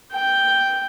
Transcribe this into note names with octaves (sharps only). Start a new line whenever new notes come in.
G5